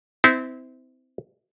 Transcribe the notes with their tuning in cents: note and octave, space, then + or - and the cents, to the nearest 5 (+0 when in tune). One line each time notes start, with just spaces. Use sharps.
C4 -25 E4 -30